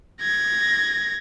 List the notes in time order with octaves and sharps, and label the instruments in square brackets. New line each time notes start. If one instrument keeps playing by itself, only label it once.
[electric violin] G#6 A#6